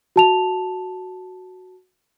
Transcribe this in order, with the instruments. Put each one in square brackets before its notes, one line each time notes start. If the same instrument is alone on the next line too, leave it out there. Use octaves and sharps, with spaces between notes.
[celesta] F#4 A5 F7